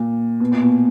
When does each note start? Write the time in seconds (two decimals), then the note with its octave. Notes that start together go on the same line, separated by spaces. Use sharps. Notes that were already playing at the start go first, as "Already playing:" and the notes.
Already playing: A#2
0.40 B2
0.52 A#2
0.61 B2